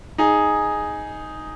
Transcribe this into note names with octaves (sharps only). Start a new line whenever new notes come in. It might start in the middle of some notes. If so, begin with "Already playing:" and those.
D#4 G#4